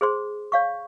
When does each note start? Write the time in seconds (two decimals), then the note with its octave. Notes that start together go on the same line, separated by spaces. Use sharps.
0.01 G#4 C5 C6
0.52 C#5 F5 C#6